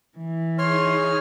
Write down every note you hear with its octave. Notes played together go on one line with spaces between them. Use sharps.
E3
D#4 G#4 C#5 C6 F6